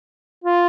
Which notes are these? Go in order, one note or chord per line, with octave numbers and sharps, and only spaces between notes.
F4